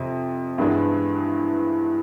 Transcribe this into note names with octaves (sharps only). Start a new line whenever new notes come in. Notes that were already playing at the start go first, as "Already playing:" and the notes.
Already playing: F2 C3
G2 E3 G#3 B3 D4